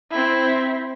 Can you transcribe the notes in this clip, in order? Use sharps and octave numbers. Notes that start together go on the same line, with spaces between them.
C4 E4